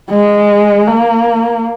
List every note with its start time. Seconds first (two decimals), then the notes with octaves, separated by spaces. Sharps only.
0.10 G#3
0.88 A#3